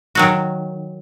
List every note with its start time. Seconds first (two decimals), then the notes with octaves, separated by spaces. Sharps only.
0.15 D#3 F#3 F#4